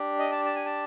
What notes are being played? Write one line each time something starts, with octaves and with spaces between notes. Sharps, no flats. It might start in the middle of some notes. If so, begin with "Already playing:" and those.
Already playing: D4 G4
D#5
A5
A5
G#5
A5